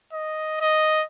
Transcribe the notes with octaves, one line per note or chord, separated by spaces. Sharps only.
D#5
D#5